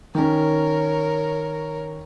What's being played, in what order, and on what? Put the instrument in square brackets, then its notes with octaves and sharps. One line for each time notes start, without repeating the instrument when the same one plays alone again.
[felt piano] D#3 C#4 [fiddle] A#4 C#5